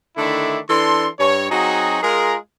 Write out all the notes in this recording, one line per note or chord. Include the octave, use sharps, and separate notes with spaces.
D3 D#3 A3 D4 E4
E3 D4 A4 C6
G2 C#5
F#3 C4 D#4 F#4 G#4
G#3 F4 G#4 A#4